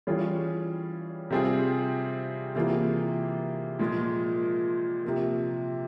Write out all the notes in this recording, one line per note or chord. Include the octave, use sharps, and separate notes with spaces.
E3 G3 C#4 F4 G#4
C3 G3 C4 F4 G#4
C3 E3 A#3 F4 G#4
A#2 F3 G#3
C3 F3 A#3